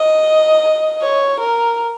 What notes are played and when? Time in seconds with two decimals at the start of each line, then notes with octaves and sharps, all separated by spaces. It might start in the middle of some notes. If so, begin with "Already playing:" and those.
Already playing: D#5
1.02 C#5
1.40 A#4